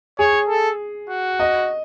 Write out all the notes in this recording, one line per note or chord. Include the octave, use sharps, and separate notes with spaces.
G#4 C#5
A4
F#4
D#5